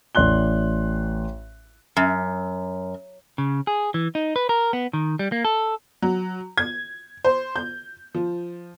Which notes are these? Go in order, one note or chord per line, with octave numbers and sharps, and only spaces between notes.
A1 D5 C6 F#6 G7
F#2
C#3
G#4
E3
D#4
B4
A#4
B3
D#3
G3
A#3
A4
F#3
G#6
C5
G6
F3